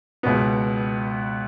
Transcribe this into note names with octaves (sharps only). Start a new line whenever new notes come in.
C#2 B2 B3